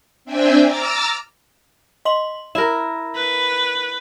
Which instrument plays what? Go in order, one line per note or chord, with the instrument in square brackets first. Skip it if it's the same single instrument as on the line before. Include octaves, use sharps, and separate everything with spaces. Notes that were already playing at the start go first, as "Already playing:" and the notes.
[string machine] C4 D4 E5 G5 G#5
A#5 D6 E6 F6 A6
[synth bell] D#5 C6 F#7
[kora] E4 A#4 [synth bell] E7
[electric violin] B4